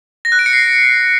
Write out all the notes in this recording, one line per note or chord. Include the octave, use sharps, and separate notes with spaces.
A#6
F#6
D7
C#7
C7